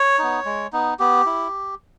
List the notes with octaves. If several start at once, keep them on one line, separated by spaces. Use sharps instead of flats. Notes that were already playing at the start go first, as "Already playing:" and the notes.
Already playing: C#5
B3 D#4
G#3
B3 D#4
B3 G4
E4